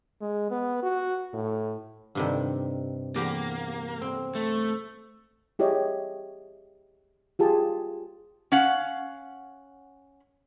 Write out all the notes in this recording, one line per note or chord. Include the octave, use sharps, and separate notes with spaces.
G#3
B3
F#4
A2
G2 C3 D#3
E2 A#3 G4
C4
A3
E4 G4 G#4 C#5 D#5
F4 G4 G#4 A5
C#4 F5 F#5